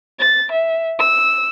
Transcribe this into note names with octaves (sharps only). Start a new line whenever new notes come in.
A6
E5
E6